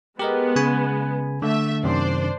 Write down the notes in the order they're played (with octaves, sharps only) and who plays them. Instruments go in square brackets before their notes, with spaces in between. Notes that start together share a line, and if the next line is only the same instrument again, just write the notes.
[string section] G#3 B3 [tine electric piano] G4 A#4 D#5
[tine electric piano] C#3 G#5 B5
[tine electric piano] D3 [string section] A3 E5
[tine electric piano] F#2 C3 D#3 [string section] D4 C5 D5